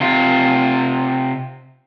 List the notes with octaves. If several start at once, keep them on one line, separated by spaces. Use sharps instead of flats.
C3 F4